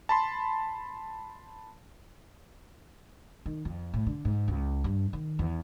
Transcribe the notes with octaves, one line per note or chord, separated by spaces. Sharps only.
A5 B5 C6
D#3
F2
A2
D3
G#2
C#2
G2
D#3
E2